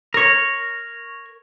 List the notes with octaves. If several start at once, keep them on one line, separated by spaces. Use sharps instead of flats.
A#4 C#5